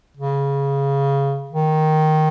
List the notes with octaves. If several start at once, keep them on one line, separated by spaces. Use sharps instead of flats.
C#3
D#3